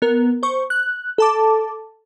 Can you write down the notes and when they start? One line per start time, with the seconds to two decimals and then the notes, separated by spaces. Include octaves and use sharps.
0.02 B3 A#4
0.43 C5 C#6
0.70 F#6
1.18 A4 A5 D6